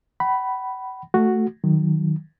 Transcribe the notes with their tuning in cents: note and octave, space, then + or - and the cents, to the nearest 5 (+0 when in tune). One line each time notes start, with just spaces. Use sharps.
F#5 +40 B5 +0
A3 +0 F#4 +0
D#3 +0 F#3 +0